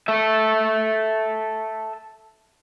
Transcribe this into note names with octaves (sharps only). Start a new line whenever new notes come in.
A4 E5